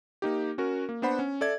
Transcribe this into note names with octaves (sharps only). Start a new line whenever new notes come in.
A#3 D#4 G4
C#4 F#4 A#4
A#3
B3 D4 C5 F#5 B5
C#4
A4 D5 E5 G#6